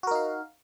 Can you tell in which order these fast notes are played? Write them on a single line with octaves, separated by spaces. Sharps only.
F#4 A#4 D#4 F5